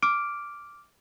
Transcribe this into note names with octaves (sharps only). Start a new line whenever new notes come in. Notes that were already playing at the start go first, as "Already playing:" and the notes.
D6 F6 D7